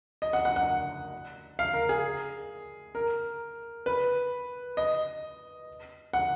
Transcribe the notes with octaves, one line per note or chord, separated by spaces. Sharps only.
D#5
F#5
F#5
F#5
F5
A#4
G#4
A#4
B4
D#5
F#5